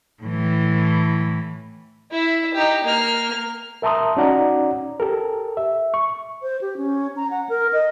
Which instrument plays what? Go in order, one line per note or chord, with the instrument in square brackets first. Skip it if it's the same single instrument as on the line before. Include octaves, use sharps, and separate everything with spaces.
[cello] A2 E3
[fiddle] E4 E5
D#4 G4
A#3 F6
[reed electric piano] A#4 E5 A5 A#5 C6 D#6
C#4 D#4 F#4 D5 F#5 A#5
G4 A4 A#4
E5
C#6
[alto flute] C5
G4
C#4
A#5
F#5
A#4
D#5